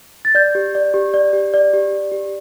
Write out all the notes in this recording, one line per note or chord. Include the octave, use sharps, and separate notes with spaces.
A6
D5 G6
G4
D5
G4
D5
G4
D5
G4
D5
G4